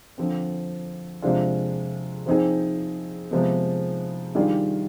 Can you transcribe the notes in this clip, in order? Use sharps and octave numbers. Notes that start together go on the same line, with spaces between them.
D3 F3 C4
C3 F3 G#3 D4 F4
F3 C4 D#4 G#4
C3 F3 G#3 B3
D#3 G3 D4 F4 G#4